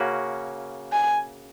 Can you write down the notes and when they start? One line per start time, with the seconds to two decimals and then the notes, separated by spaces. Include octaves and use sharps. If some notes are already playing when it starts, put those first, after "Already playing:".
Already playing: C#3 A#3 C#4 F#4
0.92 G#5